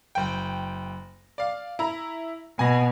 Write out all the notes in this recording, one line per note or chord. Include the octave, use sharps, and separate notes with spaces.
F#1 G5
D5 F5
E4 A#5
B2 G#5 B5 A#6